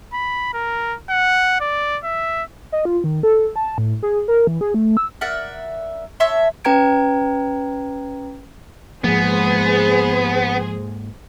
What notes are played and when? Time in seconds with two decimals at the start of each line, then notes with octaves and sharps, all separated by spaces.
0.13 B5
0.54 A#4
1.10 F#5
1.60 D5
2.04 E5
2.72 D#5
2.85 F4
3.04 D#3
3.23 A4
3.56 A5
3.78 A2
4.03 G#4
4.28 A#4
4.47 E3
4.61 G#4
4.74 A3
4.97 E6
5.21 A#4 D5 E5 F#5
6.20 C#5 E5 A5 C6
6.65 C#4 B4 G5 A#5 G#6 D7
9.04 G#2 F3 G#3 A#3 B3 G#4 C5